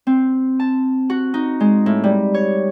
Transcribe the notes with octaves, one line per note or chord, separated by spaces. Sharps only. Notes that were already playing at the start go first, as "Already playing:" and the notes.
C4
A5
F#4
D#4
G#3
A2
G3
C#5